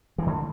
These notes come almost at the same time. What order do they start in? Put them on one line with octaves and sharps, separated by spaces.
E3 A3 D3